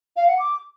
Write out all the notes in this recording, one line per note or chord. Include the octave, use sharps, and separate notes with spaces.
F5
F#5
D6